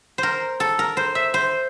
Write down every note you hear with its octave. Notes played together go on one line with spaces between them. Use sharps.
A#4 C5
A4
A#4
C5
E5
C5